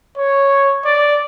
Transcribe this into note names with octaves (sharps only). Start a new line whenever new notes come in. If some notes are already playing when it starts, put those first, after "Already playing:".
C#5
D5